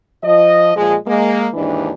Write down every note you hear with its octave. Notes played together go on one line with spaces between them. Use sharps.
F3 D#5
A#2 F3 G#3
G#3 A#3
D#2 G#2 E3 D4